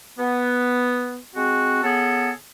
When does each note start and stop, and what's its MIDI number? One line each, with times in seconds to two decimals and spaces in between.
0.18 1.18 59
1.35 1.83 56
1.35 1.83 60
1.35 1.83 66
1.83 2.30 49
1.83 2.30 59
1.83 2.30 68
1.83 2.30 69